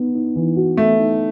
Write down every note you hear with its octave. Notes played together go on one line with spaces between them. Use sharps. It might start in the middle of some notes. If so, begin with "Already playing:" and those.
Already playing: B3 D#4
D#4
E3
F#4
A3 B3
D#4